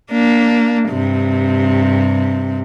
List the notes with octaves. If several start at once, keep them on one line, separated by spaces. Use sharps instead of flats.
A#3 D4
G2 C3